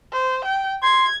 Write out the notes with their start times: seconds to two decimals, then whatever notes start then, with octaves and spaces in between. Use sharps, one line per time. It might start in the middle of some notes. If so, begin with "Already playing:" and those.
0.13 C5
0.44 G5
0.83 C6 G#6